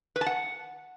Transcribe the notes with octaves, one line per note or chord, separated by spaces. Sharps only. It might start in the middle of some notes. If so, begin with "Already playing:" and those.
B4
A5
F#5